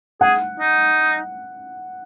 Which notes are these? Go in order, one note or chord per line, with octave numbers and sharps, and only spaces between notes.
G#4 F#5
D#4